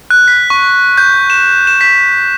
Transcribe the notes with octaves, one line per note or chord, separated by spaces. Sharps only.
F#6
B6
C#6
G6
E7
E7
B6